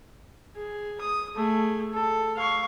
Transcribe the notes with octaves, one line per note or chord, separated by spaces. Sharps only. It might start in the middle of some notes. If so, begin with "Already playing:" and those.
G#4
D#6
A3 G#4
A4
F5 C#6